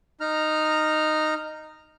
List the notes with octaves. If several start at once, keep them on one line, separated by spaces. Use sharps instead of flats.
D#4 A#5 F6